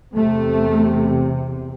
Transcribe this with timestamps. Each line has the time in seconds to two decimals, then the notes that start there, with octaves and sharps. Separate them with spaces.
0.15 E2 C3 A3